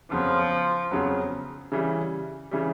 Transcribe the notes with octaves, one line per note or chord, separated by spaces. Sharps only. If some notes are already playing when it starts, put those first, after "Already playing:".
F2 C#3 F3 F#3 B3
F2 C#3 F#3 B3
C#3 E3 G3
C#3 E3 G3